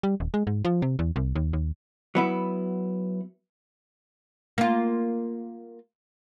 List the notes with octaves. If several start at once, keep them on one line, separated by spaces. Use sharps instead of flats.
G3
D#1
G#3
G#2
F3
C3
E2
C2
D#2
D#2
F#3 B3 E4
A#3 F4